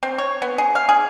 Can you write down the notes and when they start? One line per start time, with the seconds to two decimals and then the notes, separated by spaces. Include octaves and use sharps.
0.03 C4
0.18 C#5
0.42 B3
0.58 G#4
0.75 F5
0.89 G#4